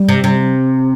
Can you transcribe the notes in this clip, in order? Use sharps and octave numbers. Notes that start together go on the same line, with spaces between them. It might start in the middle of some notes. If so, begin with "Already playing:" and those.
Already playing: G3
C3
C3